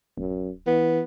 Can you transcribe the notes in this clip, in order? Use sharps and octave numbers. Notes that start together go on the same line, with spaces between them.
D1 F#2
E3 B3